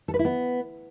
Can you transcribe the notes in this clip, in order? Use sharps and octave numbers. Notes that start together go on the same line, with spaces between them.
A4
B4
E4
B3